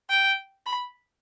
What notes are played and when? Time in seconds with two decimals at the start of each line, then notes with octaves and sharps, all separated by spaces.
0.10 G5
0.66 B5